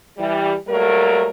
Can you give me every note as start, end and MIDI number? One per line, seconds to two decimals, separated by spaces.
0.18 0.53 52
0.18 0.53 55
0.68 1.30 54
0.68 1.30 55
0.68 1.30 57
0.68 1.30 58
0.68 1.30 70